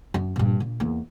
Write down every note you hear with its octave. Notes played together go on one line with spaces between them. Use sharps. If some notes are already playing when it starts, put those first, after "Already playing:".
F#2
G2 A#2
A#2
E2 A#3